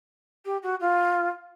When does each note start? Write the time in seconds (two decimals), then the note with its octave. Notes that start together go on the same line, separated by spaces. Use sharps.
0.45 G4
0.62 F#4
0.80 F4